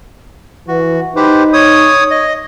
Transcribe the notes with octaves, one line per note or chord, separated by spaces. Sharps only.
E3 F#4
D#4 G4 B4 C5
C#5 D#6
D#5